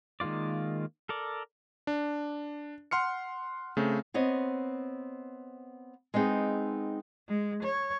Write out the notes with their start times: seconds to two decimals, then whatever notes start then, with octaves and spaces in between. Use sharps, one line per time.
0.20 D#3 G#3 A#3 F4 D5
1.09 A4 A#4 D5
1.87 D4
2.91 F#5 C6 F6 C#7
3.77 C#3 A3 C4
4.14 B3 C4 C#5 D#5
6.14 G#3 B3 C4 D#4 G#4
7.28 G#3
7.63 C#5